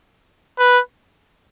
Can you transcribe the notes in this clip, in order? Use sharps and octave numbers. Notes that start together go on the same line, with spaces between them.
B4